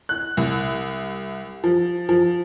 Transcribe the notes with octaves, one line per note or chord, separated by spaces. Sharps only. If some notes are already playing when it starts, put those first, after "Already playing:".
F#6
C2
F3
F3